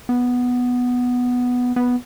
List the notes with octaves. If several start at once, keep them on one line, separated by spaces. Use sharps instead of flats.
B3
B3